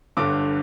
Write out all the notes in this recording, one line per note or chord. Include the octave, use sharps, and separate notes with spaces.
G1 G2 D3 D6